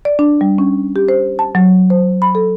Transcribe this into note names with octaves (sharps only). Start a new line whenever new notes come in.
D5
D4
G3
C#4
G4
C5
A5
F#3
C5
B5
A4